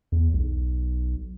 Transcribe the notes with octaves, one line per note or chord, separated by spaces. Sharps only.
E2
B1